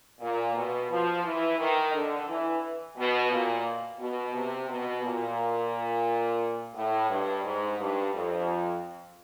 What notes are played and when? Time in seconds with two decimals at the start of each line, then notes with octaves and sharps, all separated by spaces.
0.21 A#2
0.55 B2
0.90 F3
1.24 E3
1.59 D#3
1.94 D3
2.28 E3
2.97 B2
3.31 A#2
3.99 B2
4.34 C3
4.69 B2
5.03 A#2
6.75 A2
7.09 G2
7.44 G#2
7.79 G2
8.13 F2